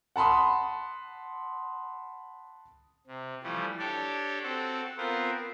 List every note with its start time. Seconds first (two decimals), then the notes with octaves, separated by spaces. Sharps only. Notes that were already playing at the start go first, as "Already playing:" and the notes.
0.16 F#5 A5 B5 C6 D#6
3.07 C3
3.43 E3 F3 G3 A3
3.79 D4 G4 A4 C#5 D5
4.43 C4 F#4 A4
4.98 B3 C4 F4 A#4 C5